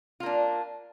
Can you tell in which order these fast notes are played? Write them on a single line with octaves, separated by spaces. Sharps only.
F4 A#3 D4